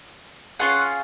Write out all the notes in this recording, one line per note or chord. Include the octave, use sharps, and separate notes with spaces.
C#4 F4 G#4 F#5